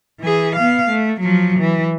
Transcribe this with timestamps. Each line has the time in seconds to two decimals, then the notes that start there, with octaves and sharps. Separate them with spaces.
0.20 E3 G#4
0.55 B3 F5
0.89 A3
1.20 F3 F#3
1.59 E3